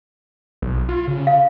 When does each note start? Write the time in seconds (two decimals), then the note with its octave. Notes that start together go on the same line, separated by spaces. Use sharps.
0.62 B1
0.89 F4
1.08 C#3
1.27 F5